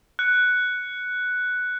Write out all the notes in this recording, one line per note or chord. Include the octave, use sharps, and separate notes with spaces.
F#6 C#7